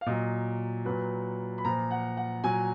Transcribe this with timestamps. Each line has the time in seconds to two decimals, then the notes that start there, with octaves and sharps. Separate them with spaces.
0.01 F5
0.06 A#2 F#3 D#5
0.85 A#2 F#3 B4
1.58 B5
1.65 A#2 F3 A#5
1.91 F#5
2.17 F#5
2.44 A#2 F#3 G#5